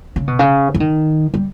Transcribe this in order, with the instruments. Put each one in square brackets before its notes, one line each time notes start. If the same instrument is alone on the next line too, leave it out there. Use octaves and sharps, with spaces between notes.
[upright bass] C#3
B2
C#3
E3
D#3
G3